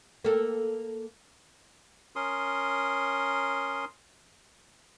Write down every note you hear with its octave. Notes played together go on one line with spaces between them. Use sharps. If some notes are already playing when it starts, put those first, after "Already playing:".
A#3 A4
C#4 A#4 C6 D#6